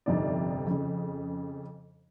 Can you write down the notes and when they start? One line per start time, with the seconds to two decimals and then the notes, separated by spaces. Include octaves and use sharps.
0.06 G1 F2 C3 D#4 D5
0.66 F2 C#3